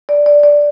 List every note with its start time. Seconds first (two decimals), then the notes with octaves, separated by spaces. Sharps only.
0.09 D5
0.26 D5
0.43 D5